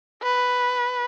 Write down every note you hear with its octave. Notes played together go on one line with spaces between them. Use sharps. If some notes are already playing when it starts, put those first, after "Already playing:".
B4